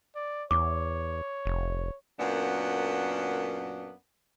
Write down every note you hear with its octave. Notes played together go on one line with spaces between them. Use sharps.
D5
E2 C#5 D6
F1
F#2 A#2 A#3 B3 D4